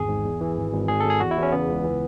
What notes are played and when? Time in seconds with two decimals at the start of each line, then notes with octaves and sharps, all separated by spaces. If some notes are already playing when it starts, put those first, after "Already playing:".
Already playing: G#1 E2 G#4
0.08 G#2
0.25 E2
0.41 E3
0.57 G#1
0.73 G#1
0.88 G#1 G#4
1.00 G#1 A4
1.10 G#4
1.20 E2 F#4
1.31 E4
1.37 E2
1.42 C#4
1.52 C#3 B3
1.69 C#2
1.84 E3